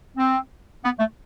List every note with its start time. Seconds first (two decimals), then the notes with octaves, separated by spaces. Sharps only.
0.17 C4
0.84 B3
1.00 A3